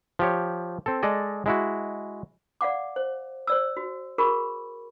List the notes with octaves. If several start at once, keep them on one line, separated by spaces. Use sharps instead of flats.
F3 G4 C#5
C4 A4
G#3 A4 D5 D#5
G#3 E4 F#4
D5 F5 F#5 D6
C5
C5 D5 E6
F#4
F#4 G#4 A#4 B5 C#6